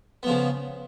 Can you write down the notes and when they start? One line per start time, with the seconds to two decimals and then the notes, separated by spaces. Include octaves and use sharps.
0.23 B3
0.26 F3
0.30 C#3